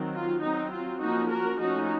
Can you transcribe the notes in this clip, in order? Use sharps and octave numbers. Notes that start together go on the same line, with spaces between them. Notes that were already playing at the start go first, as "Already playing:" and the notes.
Already playing: D#3 F#3 C4
F4
F#3 C4 D#4
F4
F3 A#3 C#4 D#4 F#4
F#4 A#4
F3 A3 C#4 D#4 F#4